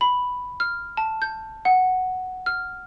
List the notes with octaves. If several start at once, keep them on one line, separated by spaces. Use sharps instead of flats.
B5
F6
A5
G6
F#5
F6